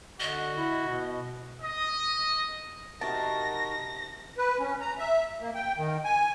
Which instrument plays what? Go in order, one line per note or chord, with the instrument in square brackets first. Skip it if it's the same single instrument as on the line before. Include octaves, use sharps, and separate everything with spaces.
[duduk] D3 [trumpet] F#4 [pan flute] D#5
[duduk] E4
B2
[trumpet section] D#5
[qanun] C3 [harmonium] D#4 F#4 A#4 [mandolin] A5 [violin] A#6
[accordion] B4
C#4
A#5
E5
A#3
G5
D#3
G#5